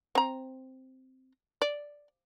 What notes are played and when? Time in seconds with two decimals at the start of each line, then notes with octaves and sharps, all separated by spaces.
0.15 C4 A#5
1.62 D5